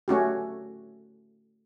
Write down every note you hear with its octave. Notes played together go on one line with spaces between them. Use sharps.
A3 C#4 F#4 G4